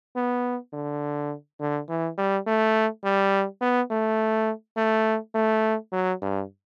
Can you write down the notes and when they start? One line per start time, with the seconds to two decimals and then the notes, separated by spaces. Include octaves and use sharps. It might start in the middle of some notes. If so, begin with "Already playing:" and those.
0.16 B3
0.73 D3
1.60 D3
1.89 E3
2.18 G3
2.47 A3
3.04 G3
3.61 B3
3.90 A3
4.77 A3
5.35 A3
5.92 F#3
6.22 G2